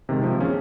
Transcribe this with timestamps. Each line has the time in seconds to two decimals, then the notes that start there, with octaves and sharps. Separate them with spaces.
0.09 C3 D#3 G#3
0.23 F3
0.39 A#3 C#4 G#4